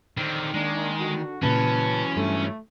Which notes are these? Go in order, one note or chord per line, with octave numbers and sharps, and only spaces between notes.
D3 D#3 C4
G#3 A#3 D4
D3 F#4
A#2 C#3 E3 F#3 C#4 B4 A5
G2 A3